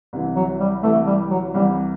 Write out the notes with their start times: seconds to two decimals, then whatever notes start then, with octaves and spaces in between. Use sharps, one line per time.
0.13 C2 C3 E3
0.36 F#3
0.60 G3
0.83 C2 C3 E3 A3
1.07 G3
1.30 F#3
1.54 C2 C3 E3 G3